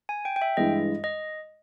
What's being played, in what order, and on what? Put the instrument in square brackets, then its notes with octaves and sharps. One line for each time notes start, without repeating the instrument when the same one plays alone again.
[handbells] G#5
G5
G5
E5
[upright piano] G2 E3 G#3 [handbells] D#5
[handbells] D#5